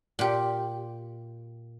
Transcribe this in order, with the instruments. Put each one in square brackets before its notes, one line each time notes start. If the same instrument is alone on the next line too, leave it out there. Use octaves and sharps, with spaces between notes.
[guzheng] A#2 G4